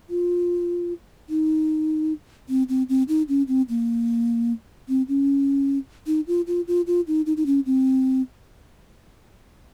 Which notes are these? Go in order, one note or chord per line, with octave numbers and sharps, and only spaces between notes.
F4
D#4
C4
C4
C4
D#4
C#4
C4
A#3
C4
C#4
D#4
F4
F4
F4
F4
D#4
D#4
D#4
C#4
C4